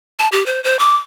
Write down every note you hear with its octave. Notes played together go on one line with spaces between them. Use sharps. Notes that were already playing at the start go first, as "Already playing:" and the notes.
A5
G4
C5
C5
D6